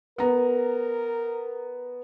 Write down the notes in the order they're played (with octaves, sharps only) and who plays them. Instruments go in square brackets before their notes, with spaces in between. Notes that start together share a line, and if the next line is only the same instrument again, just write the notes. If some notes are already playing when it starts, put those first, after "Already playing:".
[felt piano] B3 A#5 [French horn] A#4